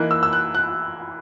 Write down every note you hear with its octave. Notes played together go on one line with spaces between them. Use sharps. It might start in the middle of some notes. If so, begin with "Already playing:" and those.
Already playing: E3 A#3 D#4 F#6
E6
E6
F#6
F#6